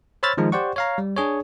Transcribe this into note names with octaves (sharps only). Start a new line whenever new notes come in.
C5 C#5 B5 E6 F6 A6
D#3 F3 G#3 D#4
G4 C5 D5 F#5 C#6
C#5 F5 A#5
G3
D4 G#4 C#5